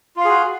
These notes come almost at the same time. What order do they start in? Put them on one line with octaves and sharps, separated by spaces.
F4 F5 G#4 F#4